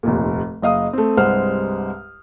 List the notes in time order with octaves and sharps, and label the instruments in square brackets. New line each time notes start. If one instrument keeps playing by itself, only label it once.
[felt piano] F1 D#2 A#2
F#1 D#5 F5 D#6
A3 C4
C2 G2 G#3 C5 F#5 F6